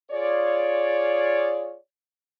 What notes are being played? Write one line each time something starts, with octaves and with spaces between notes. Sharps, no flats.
F4 G#4 C#5 D5